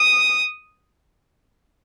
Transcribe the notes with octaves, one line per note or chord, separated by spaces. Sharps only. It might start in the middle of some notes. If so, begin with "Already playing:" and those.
Already playing: D#6